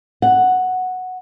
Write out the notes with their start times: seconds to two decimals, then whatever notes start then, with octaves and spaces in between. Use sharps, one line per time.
0.22 F#5